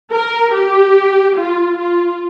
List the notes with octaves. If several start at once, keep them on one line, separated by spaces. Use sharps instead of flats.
A#4
G4
F4
F4